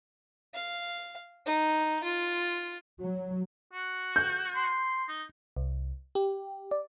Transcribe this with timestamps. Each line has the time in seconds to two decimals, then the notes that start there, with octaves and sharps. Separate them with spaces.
0.54 F5
1.46 D#4
2.04 F4
3.00 F#3
3.73 F#4
4.16 G6
4.55 C6
5.08 D#4
5.57 C2
6.15 G4
6.71 D5